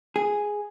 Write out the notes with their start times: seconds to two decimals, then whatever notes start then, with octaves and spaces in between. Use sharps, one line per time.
0.16 G#4